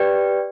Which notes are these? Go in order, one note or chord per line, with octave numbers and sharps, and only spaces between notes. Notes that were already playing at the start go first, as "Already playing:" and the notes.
Already playing: G4 B4 D5 G5